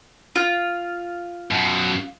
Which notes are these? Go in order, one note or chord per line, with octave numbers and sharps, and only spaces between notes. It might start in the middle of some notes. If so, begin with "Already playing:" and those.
F4
F#2 B2